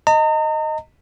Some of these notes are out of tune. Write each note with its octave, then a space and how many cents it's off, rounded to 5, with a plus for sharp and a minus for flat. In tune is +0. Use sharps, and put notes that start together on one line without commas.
D#5 +0 A#5 -40